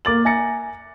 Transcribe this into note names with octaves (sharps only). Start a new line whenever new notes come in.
A#3 D6 A6 F#7
E5 G#5 A#5 A6 A#6 C#7